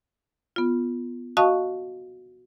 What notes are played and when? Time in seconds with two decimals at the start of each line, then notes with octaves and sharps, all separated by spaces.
0.56 B3 F4
1.37 F#4 D#5 F5 A5 C#6 D#6